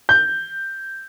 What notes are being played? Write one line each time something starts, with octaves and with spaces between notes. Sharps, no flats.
G6